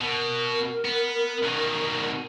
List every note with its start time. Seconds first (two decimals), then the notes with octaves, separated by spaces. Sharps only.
0.01 B2 A#4
0.85 B3
1.43 B2 D#3